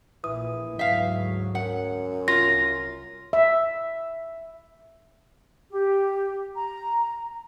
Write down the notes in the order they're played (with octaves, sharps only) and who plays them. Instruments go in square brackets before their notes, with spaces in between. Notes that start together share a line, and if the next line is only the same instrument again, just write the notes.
[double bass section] A#1 A#2 [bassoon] E3 [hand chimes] D#6
[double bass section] D2 G#2 F#3 [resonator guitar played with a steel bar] E5 F5
[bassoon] F#2 [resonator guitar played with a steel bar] F#5
[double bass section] C2 [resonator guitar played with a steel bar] F4 [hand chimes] A#6
[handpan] E5
[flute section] G4
A#5